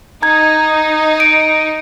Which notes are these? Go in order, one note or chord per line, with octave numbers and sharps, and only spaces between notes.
D#4 A#5 G#6
D7